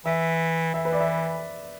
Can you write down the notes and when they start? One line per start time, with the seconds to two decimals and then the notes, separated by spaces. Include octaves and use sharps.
0.05 E3 E5
0.74 E3 E5
0.85 B4
0.92 D5
1.00 E5